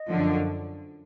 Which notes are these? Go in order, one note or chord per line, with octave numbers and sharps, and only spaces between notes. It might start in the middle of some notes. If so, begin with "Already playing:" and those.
Already playing: D#5
F#2 D3 F3